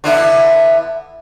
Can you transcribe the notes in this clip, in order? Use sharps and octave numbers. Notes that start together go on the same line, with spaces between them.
D3 B3 E4